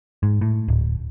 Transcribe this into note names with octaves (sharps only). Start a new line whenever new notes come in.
G#2
A2
D1